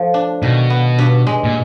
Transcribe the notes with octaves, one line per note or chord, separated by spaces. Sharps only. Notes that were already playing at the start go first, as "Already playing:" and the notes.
Already playing: F3 A3
D4
B2 D#3
B3
G2
G#3
A#2